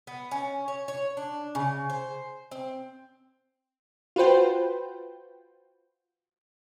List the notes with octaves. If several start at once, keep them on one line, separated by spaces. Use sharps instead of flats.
B3
C#4
C#5
C#5
D4
C#3
C5
C4
F4 F#4 B4 C5 G5